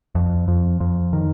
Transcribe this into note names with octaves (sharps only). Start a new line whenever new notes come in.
F2
F2
F2
D#3